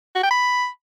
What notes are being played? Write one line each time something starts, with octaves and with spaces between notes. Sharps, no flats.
F#4
G5
B5